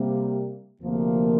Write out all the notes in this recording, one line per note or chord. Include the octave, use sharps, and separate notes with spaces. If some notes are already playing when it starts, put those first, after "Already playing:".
Already playing: C3 G3 A#3
D2 C3 F3 A#3